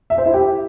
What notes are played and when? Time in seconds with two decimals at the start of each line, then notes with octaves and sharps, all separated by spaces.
0.10 E5
0.18 C5
0.26 E4
0.34 G4